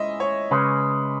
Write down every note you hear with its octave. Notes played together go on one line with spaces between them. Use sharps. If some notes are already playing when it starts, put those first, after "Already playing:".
Already playing: G#3 C#4 E4 D#5 E5
C#5
C#3 G#3 C#4 B4